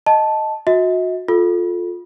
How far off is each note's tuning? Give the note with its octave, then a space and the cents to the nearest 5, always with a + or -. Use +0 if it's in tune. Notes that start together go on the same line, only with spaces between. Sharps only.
D#5 +0 A5 -5
F#4 -30 D#5 +45
F4 +15 A4 -10